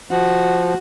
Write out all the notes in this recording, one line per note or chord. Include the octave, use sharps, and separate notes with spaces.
F3 F#4